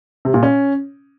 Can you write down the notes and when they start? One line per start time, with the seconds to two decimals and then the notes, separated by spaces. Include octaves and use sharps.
0.25 C3
0.34 A#2
0.43 C#4